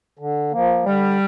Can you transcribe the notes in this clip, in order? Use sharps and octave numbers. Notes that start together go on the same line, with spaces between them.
D3
F3 A#3
D3 G3